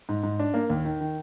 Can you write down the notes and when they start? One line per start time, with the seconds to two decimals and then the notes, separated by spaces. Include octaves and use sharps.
0.09 G#2
0.23 G#2
0.39 D4
0.54 A#3
0.70 D#2
0.85 D#3
1.01 D#3